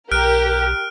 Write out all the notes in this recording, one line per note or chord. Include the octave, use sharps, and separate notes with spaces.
B1 G4 A#4 F6 F#6 D7